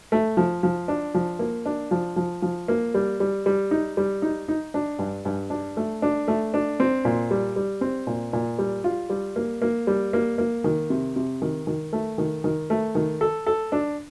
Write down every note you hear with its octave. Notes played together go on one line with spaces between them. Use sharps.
A3
F3
F3
D4
F3
A#3
D4
F3
F3
F3
A#3
G3
G3
G3
D#4
G3
D#4
D#4
D4
G2
G2
D4
A3
D4
A3
D4
C4
A#2
G3
G3
C4
A#2
A#2
G3
F4
G3
A#3
A#3
G3
A#3
A#3
D#3
C3
C3
D#3
D#3
A3
D#3
D#3
A3
D#3
A4
A4
D4